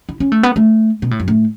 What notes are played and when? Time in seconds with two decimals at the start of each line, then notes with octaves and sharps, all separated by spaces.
0.09 E4
0.20 C#4
0.32 A3
0.43 B3
0.56 A3
1.02 B2
1.11 A2
1.20 F#2
1.28 A2